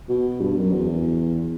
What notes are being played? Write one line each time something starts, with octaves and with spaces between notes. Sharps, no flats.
B2
G2
F#2
E2